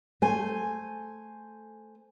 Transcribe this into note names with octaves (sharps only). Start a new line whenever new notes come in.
A3 C5 G#5